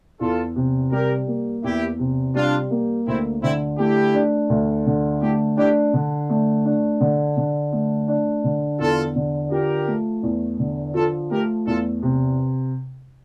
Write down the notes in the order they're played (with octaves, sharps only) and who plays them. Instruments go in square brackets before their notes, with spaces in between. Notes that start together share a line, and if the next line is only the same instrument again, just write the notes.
[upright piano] E2 [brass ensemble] F4 A4
[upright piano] C3
[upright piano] G3 [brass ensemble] G4 A#4
[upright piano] A#3
[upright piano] E2 [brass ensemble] E4 G4
[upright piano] C3
[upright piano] G3 [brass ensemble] D4 F4
[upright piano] A#3
[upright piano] D2 [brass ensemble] C4 E4
[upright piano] D3 [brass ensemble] C4 E4
[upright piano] A3 [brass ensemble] E4 G4
[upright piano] D4
D2
D3
[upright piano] A3 [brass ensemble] E4 G4
[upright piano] D4 [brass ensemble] E4 G4
[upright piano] D3
A3
D4
D3
D3
A3
D4
D3
[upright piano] E2 [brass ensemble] F4 A4
[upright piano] D3
[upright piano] F3 [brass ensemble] G4 A#4
[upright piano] A3
E2
D3
[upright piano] F3 [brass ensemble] F4 A4
[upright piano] A3 [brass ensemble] G4 A#4
[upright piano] E2 [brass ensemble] F4 A4
[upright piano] C3